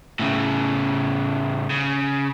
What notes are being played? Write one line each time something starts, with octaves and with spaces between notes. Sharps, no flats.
A2 C#3
C#3